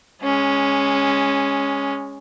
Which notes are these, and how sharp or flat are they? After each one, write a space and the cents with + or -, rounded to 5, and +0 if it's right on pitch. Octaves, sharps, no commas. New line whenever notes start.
G#3 -10 C#4 +0